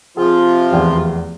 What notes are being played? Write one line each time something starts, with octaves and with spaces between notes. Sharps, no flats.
C3 F3 F4 G#4
F1 E2